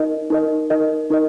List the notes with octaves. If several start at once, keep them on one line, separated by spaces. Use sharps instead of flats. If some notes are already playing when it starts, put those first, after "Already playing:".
Already playing: D#4 A#4 D#5
D#4 A#4 D#5
D#4 A#4 D#5
D#4 A#4 D#5